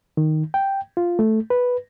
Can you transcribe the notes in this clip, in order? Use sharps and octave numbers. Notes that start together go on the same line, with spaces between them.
D#3
G5
F4
A3
B4